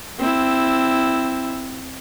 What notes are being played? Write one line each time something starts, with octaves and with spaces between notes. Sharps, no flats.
C4 E4